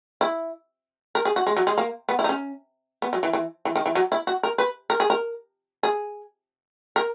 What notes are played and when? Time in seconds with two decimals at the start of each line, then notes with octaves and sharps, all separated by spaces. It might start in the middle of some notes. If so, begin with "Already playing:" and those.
0.21 E4
1.15 A#4
1.25 G#4
1.36 F#4
1.47 G#3
1.57 F#3
1.67 G#3
1.78 A#3
2.09 B3
2.19 E4
2.24 D#4
2.29 C#4
3.02 B3
3.13 F#3
3.23 E3
3.33 E3
3.65 E3
3.76 D#3
3.86 E3
3.95 F#3
4.12 E4
4.27 F#4
4.43 A#4
4.58 B4
4.90 A#4
5.00 G#4
5.10 A#4
5.83 G#4
6.96 A#4